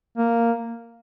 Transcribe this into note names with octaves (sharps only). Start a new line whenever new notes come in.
A#3